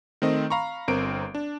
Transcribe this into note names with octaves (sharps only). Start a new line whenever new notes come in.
D#3 A3 C4 D#5
F5 A#5 B5 C#6
G1 C4 A#4 D7
D4